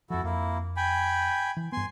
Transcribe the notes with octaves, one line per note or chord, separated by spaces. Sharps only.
F2 F3 E4 F#4 A4
F2 A#3 E4
G5 G#5 B5
E3
G2 B3 G#5 C6